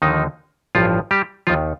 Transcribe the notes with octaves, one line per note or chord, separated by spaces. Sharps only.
D#2 D3 D#3 F3 D#4
A1 G2 F3 F4
G3 G4
D#2 D#3 F3 F4